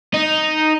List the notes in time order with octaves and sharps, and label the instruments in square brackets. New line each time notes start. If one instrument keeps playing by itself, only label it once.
[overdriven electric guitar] D#4